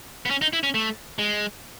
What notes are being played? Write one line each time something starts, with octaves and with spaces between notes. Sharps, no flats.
B3
C#4
D#4
E4
C#4
A3
G#3